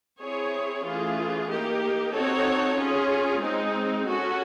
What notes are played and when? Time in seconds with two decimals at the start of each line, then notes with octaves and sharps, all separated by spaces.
0.21 C4 E4 G#4 C#5
0.85 E3 A3 C#4 F4 G#4
1.50 A#3 D#4 G4 A#4
2.13 C4 D#4 F#4 A4 C#5
2.77 C#4 F4 G#4
3.41 G#3 C4 D#4
4.07 C#4 F#4 A4